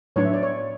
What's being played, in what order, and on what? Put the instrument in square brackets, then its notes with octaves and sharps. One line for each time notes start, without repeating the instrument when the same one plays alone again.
[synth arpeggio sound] A2 F#3 B3 D4 [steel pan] C#5
[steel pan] E5
D5
C#5